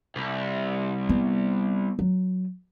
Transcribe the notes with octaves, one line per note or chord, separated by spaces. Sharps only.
C2
B3
F#3